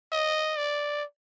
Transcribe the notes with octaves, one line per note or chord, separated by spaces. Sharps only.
D#5
D5